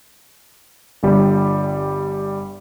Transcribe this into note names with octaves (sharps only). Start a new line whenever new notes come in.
G1 G3